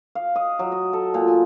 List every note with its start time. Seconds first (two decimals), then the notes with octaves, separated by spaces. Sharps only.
0.15 F5
0.36 D#5
0.59 F#3
0.72 D#5
0.93 A4
1.14 A#2
1.27 G#5